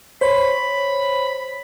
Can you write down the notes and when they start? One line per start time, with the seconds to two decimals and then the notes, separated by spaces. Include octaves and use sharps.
0.21 C5 C#5 B5